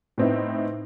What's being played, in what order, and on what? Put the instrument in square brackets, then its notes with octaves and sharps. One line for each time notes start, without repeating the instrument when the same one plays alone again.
[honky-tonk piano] A2 B3 C4 D#4 E4